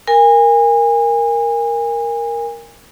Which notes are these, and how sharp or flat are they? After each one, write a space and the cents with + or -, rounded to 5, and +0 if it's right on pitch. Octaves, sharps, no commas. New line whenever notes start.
A#4 +0 G#5 -30